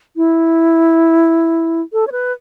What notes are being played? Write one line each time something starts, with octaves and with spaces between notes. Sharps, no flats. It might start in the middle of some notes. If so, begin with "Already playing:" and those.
E4
A4
C#5
B4